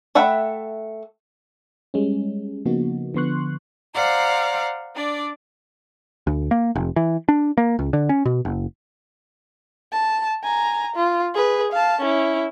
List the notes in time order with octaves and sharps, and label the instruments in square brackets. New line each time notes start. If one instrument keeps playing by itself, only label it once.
[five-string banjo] A3 E5 F#5 G5 B5
[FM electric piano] G3 G#3 C#4
C#3 F3 A#3 B3 D#4 F#4
D3 F3 B3 C6 C#6 F#6
[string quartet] C5 D5 F5 F#5 A#5
D4 D5
[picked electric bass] D2
A#3
F1
E3
D4
A#3
C#2
D3
C#4
B2
F#1
[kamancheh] A5
G#5 A#5
F4
G#4 B4
F5 A5
C#4 E4